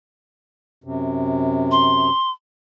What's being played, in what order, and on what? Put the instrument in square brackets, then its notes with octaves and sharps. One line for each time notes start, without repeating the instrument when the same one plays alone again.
[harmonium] F#2 C3
[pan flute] C6